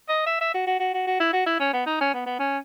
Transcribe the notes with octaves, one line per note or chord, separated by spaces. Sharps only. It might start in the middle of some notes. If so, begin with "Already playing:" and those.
D#5
E5
E5
F#4
F#4
F#4
F#4
F#4
E4
F#4
E4
C#4
B3
D#4
C#4
B3
B3
C#4